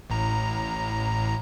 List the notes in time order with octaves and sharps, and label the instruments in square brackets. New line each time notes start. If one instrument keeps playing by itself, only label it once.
[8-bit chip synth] A1 A2 A#5